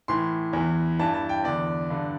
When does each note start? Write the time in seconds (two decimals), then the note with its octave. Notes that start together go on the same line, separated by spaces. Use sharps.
0.08 A2 E3 C6
0.53 E2 E3
0.99 G2 E3 A5
1.14 A5
1.29 G5
1.44 E2 D3 D5
1.90 G2 D3